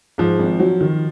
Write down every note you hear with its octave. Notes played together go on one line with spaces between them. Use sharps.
G#2 F3
G#1
F#3
D#3